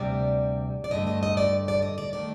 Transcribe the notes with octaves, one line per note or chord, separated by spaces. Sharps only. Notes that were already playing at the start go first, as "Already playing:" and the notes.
Already playing: D2 C3 G3 D5
D5
G2 D3 A3 D#5
D#5
D#5
D5
D5
D#5
D5
D#3 A3 D5